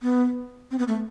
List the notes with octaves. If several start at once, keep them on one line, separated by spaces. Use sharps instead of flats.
B3
C4
B3
A3